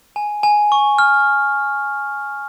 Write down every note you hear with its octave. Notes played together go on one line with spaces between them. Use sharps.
G#5
G#5
C#6
F6